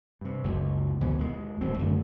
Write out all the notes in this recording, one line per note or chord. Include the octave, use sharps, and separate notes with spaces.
G2 C3
F#1 C#2
D2 B2 E3
D#2 G#3
D1 G#1 C4
F#2 D3 A3